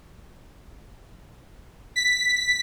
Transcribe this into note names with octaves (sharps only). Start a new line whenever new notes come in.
B6